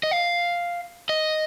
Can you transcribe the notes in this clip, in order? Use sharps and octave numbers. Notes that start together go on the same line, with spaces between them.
D#5
F5
D#5